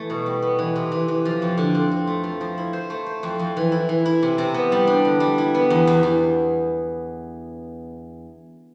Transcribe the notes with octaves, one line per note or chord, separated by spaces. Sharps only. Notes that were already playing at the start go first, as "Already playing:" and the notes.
Already playing: E3 A3 E4
B2
G3
B3
E3
C3
E3
E3
F3
F2
D3
C4
C4
A3
F3
F3
E4
C5
A3
C5
F2
F2
E3
E4
E3
E4
C3
C3
B3
G3
D4
D3
G3
E4
B3
E2
E2
E2